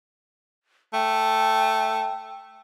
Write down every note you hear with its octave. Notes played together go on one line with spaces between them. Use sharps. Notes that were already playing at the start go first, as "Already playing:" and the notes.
A3 G5